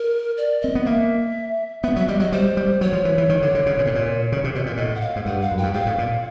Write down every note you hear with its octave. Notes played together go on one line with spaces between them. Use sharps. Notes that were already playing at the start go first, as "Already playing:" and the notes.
Already playing: A#4
D5
C4 D#5
B3
A#3 E5
B3 E5
F#3 E5
G3 D#5
F#3 D#5
G3 C5
G3
F#3 C#5
F3
E3
E3
D#3
D3
D3
C#3
A#2
A2
A#2
C#3
C3
B2
A#2
A2 D#5
F#5
F5
G#2
G2 F#5
F5
F#2
G5
G2
G#2 F5
A2
A#2